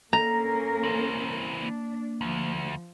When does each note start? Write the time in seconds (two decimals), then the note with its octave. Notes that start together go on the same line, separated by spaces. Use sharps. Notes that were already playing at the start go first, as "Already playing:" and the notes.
0.13 A#3 C#4 A4 A#4 A#5
0.83 E3 C4
1.60 A#3 D4
2.21 D2 F3